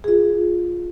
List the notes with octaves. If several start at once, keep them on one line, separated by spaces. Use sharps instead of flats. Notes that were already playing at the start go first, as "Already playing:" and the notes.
F4 G#4